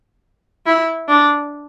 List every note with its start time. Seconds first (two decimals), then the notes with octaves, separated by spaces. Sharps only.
0.66 E4
1.09 D4